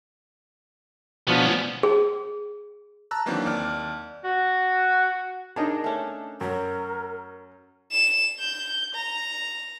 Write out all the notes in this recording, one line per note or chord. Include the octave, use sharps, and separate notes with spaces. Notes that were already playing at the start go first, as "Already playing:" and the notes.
B2 F3 B3 C#4 D4
G#4
A5 A#5 E6 F#6
D#3 E3 F#3 A#3 C4 D4
D#2 D5 F6
F#4
D4 D#4 G#4 A#4 D#5
A3 C#4
F#2 A#4
E7
G6
A#5